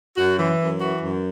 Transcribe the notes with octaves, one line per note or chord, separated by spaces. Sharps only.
F#2 F#4
E3
F#2
E3 F#4
F#2